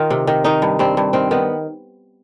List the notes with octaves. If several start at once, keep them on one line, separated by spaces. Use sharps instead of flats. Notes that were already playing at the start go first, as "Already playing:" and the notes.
Already playing: D#3 D#4 F4
C3
D#3
D#3 D#4
G2
G2 C4
G2
D#3 C4
D#3 B3